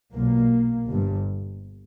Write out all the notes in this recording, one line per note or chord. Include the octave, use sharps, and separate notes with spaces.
B1 A#2 A#3
G1 G2